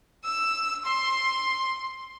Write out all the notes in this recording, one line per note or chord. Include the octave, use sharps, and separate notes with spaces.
E6
C6